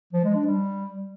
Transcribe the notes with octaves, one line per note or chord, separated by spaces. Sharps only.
F3
G#3
D4
G3